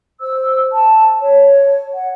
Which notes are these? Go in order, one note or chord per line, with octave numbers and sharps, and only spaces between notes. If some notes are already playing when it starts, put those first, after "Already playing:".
C5 E6
A5
C#5
F#5